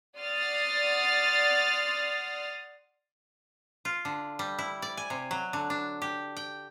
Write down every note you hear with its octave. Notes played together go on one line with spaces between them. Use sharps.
D5 F#5 C6 D#6 F6 A6
F4
D3
G3
E4
D5
G#5
C3
F#3
D3
D4
G4
G5